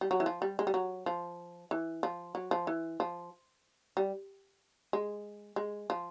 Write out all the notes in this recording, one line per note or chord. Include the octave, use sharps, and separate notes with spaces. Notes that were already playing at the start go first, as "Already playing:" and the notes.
G3
F#3
E3
F3
G3
G#3
G3
F#3
F3
E3
F3
F#3
F3
E3
F3
G3
G#3
G#3
F3